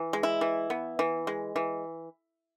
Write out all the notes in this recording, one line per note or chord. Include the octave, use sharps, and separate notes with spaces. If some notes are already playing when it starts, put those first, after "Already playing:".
Already playing: E3
G#3
E4
E3
B3
E3
G#3
E3